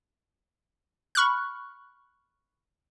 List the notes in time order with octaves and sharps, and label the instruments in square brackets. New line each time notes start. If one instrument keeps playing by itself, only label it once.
[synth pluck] B5 C#6 F6 F#6